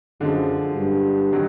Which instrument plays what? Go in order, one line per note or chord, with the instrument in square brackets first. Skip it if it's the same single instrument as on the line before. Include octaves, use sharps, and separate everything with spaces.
[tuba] F#2 [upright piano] D3 F3 G#3
[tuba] G2
[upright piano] D#3 F#3